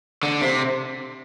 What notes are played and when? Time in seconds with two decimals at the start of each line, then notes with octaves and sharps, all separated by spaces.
0.23 D3
0.42 C3